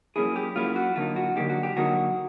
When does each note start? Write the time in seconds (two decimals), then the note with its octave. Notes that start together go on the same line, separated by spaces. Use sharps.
0.16 F#3 A#3 C#4 E4 G#4
0.36 G4
0.56 F#3 A#3 C#4 E4 F4
0.76 F#4
0.96 D3 F#3 A#3 D#4 F4
1.16 F#4
1.36 D3 F#3 A#3 D#4 G4
1.50 F#4
1.63 G4
1.76 D3 F#3 A#3 D#4 F#4